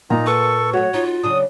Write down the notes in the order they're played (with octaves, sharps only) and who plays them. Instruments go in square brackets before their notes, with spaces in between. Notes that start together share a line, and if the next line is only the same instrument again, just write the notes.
[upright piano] A#2 [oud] A#3 [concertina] D#4 A#5
[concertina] A4 C#6 [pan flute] B4
[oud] F#3 A3 [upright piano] F#4 [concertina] C#5
[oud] D#4 [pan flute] F4
[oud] C#3 F#3 D4 [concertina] D#6